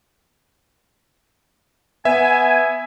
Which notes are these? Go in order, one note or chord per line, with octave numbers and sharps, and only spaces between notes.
B3 E5 G#5